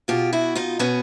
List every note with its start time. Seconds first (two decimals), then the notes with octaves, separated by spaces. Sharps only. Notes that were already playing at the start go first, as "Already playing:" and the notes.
0.08 B2 F4 G4
0.33 E4 F#4
0.55 D#4 F4
0.79 B2 B3 C#4